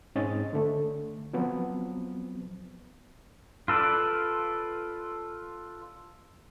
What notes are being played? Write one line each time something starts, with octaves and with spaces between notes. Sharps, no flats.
G#2 C4 C#4 D#5 A6
D3 A3
F3 F#3 B3 C4
F4 A4 B4 D5